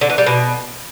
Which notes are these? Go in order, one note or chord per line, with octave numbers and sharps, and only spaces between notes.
D3
E3
G3
B2